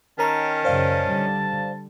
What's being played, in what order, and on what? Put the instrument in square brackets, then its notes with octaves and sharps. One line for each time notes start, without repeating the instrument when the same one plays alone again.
[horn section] D#3 C#4 [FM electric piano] A#4 A#5 [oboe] A5
[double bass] F#2 C#3 [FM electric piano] C5 D5 F5
[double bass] D3 G3